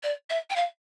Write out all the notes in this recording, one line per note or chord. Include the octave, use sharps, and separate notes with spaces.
D5
E5
G5
F5